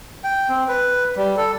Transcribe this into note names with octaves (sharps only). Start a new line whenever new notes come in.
G5
C4
B4
G3
A4